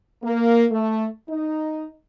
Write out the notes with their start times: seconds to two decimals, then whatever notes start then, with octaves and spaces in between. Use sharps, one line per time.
0.23 A#3
0.71 A3
1.28 D#4